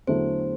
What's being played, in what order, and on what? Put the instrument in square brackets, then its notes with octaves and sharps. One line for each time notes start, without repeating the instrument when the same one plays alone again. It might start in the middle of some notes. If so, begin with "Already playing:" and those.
[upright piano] E2 D3 F#3 A3 E4 [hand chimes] C5